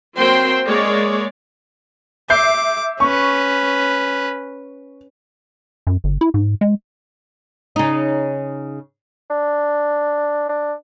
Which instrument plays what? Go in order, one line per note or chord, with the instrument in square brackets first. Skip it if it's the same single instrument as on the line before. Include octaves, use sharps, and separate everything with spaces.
[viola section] F#3 A#3 C4 C5 G5 C6
G#3 A#3 C#5 D5
[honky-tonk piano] E5 G6 C7 [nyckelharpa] D6
[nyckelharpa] C#4 B4 [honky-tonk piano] C#6
[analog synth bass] F#2
G1
E4
G#2
G#3
[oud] C#3 D#4
[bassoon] D4
D4